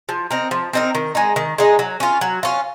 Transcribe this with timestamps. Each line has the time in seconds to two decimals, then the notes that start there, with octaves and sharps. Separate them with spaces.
0.09 F3
0.31 C4 D#4 A#4
0.51 F3
0.73 C4 D#4 A#4
0.95 D#3
1.15 G#3 D#4
1.36 D#3
1.58 G#3 D#4
1.79 F#3
2.00 C#4 F4
2.21 F#3
2.43 C#4 F4